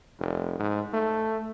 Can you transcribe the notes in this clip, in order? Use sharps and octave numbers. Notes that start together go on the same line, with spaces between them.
F1
G#2
A3